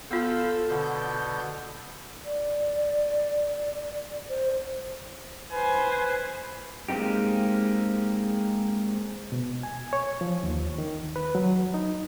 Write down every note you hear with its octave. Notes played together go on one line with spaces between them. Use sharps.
B3 F4 A4 C5 F5 E6
B2 D3 G6
D5
C5
B4 C5 G#5
G#3 A#3 C4 D#4 G4
B2
G#5
C#5
F3
D#2
D#3
B4
F#3
D#4